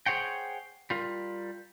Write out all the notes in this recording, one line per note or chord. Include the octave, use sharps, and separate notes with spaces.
G#4 C5 C#5 F#5 G5
G3 F4 A#4